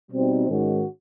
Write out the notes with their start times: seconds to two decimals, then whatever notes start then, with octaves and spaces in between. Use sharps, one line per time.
0.11 B2 G3 C4 D#4
0.48 G#2 D#3 G#3 C#4 F#4